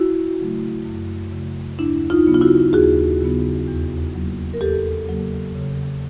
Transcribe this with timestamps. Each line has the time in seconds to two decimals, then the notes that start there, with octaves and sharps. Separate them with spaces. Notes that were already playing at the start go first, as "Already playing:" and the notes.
Already playing: E4 F#4
0.38 C#3 F#3 A3
0.85 F#2
1.32 C#3 F#3 A3
1.79 D#2 D4 E4
2.10 D#4 F4
2.27 C#3 F#3 B3
2.35 F4
2.41 E4 F#4
2.73 D#2 F#4 G#4
3.21 C#3 F#3 B3
3.67 E2
4.14 C#3 F#3 A#3
4.53 A#4
4.61 E2 G4 A4
5.09 C#3 F#3 A#3
5.55 C#3